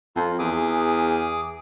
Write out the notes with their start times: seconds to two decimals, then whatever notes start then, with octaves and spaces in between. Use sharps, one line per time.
0.16 F2 F4
0.39 E2 G#4 D6 D#6